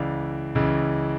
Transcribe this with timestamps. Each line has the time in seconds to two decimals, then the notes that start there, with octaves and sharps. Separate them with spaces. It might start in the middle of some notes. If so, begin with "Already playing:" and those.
Already playing: C#2 C#3 E3 D5 F5
0.55 C#2 C#3 E3